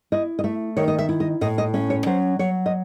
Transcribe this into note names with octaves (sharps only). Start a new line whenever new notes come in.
E4 D#5
D#5
A3 E5
D#3 C#5
D#5
E5
E4
D#5
A2 D#5
D#5
C#4 E5
C#5
F#3 C5
F#3 C#5
D#5